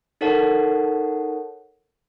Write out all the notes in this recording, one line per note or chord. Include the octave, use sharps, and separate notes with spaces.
D#4 A4 A#4 C#5 F#5 A5